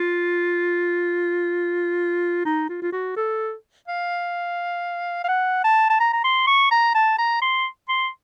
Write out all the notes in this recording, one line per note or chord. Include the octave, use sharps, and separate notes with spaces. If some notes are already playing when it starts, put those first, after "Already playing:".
Already playing: F4
D#4
F4
F4
F#4
A4
F5
F5
F#5
A5
A5
A#5
A#5
C6
C#6
A#5
A5
A#5
C6
C6